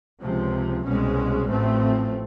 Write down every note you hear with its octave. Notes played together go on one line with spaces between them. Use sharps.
C#2 C3 F3
C2 B2 G#3 C#4
A1 A2 F3 A3 C4